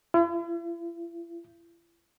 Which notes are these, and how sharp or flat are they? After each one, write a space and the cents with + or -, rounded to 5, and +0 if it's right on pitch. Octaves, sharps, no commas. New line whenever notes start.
E4 +45